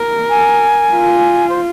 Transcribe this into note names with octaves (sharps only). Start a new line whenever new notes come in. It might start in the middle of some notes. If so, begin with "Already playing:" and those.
Already playing: A#4
G#5
F4
C5